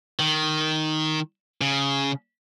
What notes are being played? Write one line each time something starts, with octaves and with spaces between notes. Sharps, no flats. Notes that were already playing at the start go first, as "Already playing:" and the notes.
D#3
C#3